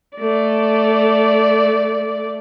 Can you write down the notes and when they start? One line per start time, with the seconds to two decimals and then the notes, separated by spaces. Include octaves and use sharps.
0.17 A3 D5